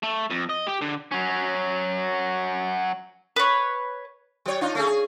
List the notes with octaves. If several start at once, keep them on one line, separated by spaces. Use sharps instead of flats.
A3
F2
D#5
G4
D3
F#3 C#4
B4 C#5
F#3 C#5
D4 D#4 F4
A3 C#4 G#4
G#4